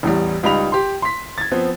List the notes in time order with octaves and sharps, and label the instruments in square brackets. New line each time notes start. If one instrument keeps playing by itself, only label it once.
[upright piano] A1 E2 G3
C#2 G3 D#4 B5 F7
G4 C6
C6 B6
G#6 A6
F3 B3 C4